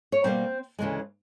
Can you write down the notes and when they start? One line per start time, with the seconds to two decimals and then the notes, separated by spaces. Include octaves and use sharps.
0.12 C#5
0.23 B2 G3 A#3 C4 C5
0.79 D2 C#3 E3 G#3